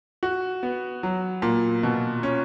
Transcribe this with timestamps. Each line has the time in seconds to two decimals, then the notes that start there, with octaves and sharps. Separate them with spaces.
0.23 F#4
0.63 B3
1.03 F#3
1.42 A#2
1.83 B2
2.23 C#4